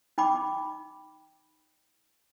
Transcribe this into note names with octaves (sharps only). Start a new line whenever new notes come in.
D#4 G5 B5 D6